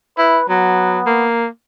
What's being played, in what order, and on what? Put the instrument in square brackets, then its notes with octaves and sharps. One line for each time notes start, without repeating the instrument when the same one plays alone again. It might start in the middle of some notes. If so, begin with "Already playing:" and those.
[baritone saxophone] E4 [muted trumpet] B4
[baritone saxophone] F#3 [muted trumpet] B3
[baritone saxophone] A#3